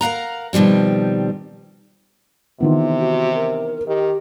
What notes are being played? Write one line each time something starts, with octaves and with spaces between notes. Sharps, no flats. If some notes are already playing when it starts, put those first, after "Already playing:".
A#4 F5 F#5 A#5
B2 D#3 F3 G3 C4
C3 D#3 E3 B3 F4
F#4
A#4
D#3 G4